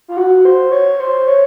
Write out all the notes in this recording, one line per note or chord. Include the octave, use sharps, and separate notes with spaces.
F4
F#4
C5
C#5
C5
C#5